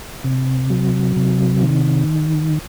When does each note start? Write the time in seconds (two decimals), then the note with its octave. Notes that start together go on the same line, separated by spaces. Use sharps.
0.24 C3
0.70 F#3
1.16 C3
1.63 D#3